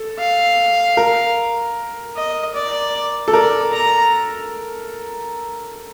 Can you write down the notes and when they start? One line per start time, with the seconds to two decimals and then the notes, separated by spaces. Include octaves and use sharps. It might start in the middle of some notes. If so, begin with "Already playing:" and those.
Already playing: A4
0.19 F5
0.97 A#4
2.16 D#5
2.54 D5
3.28 A4
3.33 A#4 D5
3.73 A#5